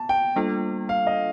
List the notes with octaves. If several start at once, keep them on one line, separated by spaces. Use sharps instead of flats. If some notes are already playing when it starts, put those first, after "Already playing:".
Already playing: B3 A5
G5
G3 A#3 D4 F4 A4
F5
D#5